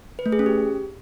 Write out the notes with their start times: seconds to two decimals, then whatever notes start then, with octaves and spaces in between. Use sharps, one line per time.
0.19 B4
0.26 A3
0.32 G#4
0.39 C#4
0.46 G4